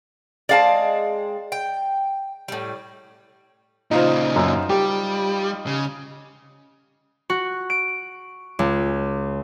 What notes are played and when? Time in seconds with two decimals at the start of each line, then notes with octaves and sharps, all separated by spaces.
0.49 G#3 C4 D5 F5 A5
1.52 G5
2.48 A2 G3
3.91 A#2 C#3 D#4 F4 C5
4.36 F#2
4.70 G3 G4
5.67 C#3
7.30 F#4
7.70 D7
8.59 C#2